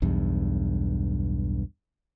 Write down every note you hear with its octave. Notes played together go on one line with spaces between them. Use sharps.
B1 E2 G2